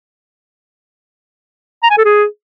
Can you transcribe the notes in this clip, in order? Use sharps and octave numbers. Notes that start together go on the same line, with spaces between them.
A#5
G#5
A4
G#4